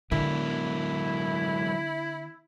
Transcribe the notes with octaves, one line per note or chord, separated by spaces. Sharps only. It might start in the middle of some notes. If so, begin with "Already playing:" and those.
D3 F#3 G#3 B3 E4 A#4